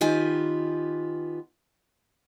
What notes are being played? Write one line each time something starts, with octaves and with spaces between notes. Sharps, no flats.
D#3 B3 F4 G4 G#5